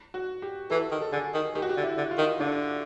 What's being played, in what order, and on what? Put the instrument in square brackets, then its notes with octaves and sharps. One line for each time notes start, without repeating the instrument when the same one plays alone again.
[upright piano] F#4
G4
[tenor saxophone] E3 [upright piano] A4
[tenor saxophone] D#3
[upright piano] A4
[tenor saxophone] D3 [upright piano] G#4
[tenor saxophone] D#3
[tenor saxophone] D#3 [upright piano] G4
[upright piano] F#4
G4
[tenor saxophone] D3
[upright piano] E4
[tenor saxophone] D3
[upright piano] F4
[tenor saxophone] D#3
[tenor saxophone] D3 [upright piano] D4